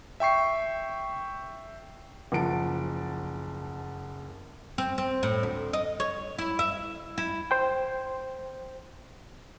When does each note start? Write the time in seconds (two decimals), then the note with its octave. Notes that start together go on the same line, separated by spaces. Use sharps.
0.20 E5 G5 C#6 C7
2.32 F#1 F3 F#5 A5 D7
4.78 C4
4.98 C4
5.23 A2
5.43 D2
5.73 D#5
6.00 C#5
6.38 E4
6.59 E5
7.18 E4
7.51 C5 G5